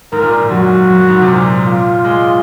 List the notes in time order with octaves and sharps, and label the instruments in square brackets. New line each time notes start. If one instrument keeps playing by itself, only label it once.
[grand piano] G#2 [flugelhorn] A#4
[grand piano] A#2
G#2
[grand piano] F#2 [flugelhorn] F#4
[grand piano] F#2
G#2
C3
A#2
[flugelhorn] F4
[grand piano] G#3